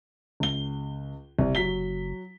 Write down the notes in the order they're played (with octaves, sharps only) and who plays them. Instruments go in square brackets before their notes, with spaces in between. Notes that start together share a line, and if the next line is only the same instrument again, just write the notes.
[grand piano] C#2 G7
[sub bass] F#1 [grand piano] C2
[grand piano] F#3 B6 G7